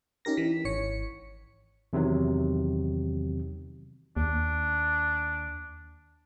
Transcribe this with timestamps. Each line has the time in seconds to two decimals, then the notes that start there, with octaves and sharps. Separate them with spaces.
0.25 C#4 D#4 G4 A#4 A#6
0.37 E3 B6
0.65 G#1 C#5 C#7
1.93 E2 C3 D#3 F#3
4.17 D#2 D4